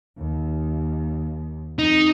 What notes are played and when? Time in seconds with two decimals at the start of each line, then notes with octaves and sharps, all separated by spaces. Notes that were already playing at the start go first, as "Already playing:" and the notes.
0.18 D#2
1.79 F2 D#4